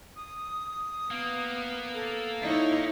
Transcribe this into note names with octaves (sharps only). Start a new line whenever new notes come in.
D#6
A#3 B3
A4
D#4 E4 C#5